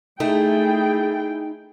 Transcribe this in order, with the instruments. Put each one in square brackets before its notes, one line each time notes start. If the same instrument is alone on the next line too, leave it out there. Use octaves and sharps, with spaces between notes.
[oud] A3 [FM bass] D#4 [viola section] E4 G#4 G5